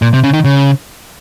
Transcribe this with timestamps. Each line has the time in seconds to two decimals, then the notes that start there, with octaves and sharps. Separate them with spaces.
0.02 A#2
0.13 C3
0.24 C#3
0.33 D#3
0.44 C#3